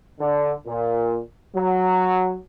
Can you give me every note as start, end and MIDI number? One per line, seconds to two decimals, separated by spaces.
0.20 0.52 50
0.66 1.20 46
1.55 2.35 54